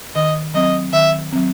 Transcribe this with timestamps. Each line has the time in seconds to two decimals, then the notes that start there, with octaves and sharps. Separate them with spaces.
0.15 D#3 D#5
0.54 F#3 C4 D#5
0.93 D#3 E5
1.32 F#3 C4